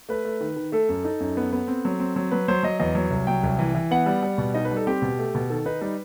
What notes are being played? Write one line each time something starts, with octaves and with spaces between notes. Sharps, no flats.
A3 B4
A3
D#3
D#3
A3 A4
F#2
D#4 A4
F#2
B3
B3
C4
F#3
C4
F#3
F#3 B4
F#3 C5
F#3 D#5
E2 D#5
F#3
C2
F#3 G5
C2
E3
E3
B3 F#5
G3
G3
B2
D#4 D#5
B4
G3
A4
C4 G4
B2
A3
B2
D#3 A4
D#4 B4
G3 B4